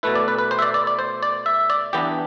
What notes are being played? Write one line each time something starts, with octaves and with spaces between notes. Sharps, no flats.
B2 A3 E4 B4
D5
B4
B4
C5
E5
D5
D5
D5
C5
D5
E5
D5
E3 B3 D4 G4